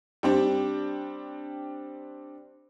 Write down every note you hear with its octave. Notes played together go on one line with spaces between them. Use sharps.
G3 C4 D4